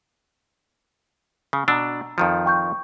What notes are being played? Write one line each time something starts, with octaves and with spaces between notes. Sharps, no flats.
C#3
B2 D4 A#5 E6
F2 D#3 F3
G5 C#6 G6